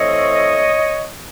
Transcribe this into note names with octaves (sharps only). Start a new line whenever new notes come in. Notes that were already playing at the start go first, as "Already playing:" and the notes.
Already playing: E3 A3 C4 C#5 D#5